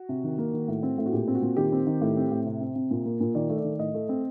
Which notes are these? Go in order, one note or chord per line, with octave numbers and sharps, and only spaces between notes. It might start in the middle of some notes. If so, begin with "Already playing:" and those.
Already playing: F#4
C3
D#3
A#3
D#3
A2
C4
A2
F#4
A#2 G4
C4
F#4
A#2
D#3 G4
C4
D#3
A2
C4
A2
C3
C4
C3
A#2
A#3
A#2
D#3 D5
A3
D5
D#3
A2 D#5
A3
C4